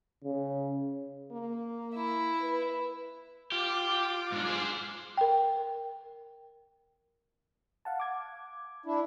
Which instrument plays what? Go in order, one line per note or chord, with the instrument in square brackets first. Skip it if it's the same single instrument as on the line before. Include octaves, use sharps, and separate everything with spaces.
[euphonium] C#3
[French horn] A#3
[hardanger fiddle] E4
[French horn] B4
[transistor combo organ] F4 D6 [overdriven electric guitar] G4
[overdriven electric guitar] G#2 D4
G#4 C5
[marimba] A#4 G5
[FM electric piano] F5 F#5 A5
D6 G#6
[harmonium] D4 E4